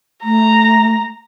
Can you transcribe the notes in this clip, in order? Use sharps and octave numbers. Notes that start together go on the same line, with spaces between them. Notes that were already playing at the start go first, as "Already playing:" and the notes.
A3 A#5